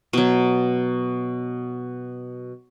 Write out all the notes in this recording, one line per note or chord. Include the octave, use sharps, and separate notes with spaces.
B2 F#3